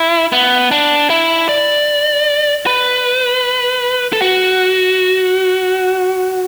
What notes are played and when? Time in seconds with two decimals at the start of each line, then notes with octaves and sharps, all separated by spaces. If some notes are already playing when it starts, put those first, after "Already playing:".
Already playing: E4
0.32 B3
0.71 D4
1.10 E4
1.49 D5
2.66 B4
4.13 A4
4.22 F#4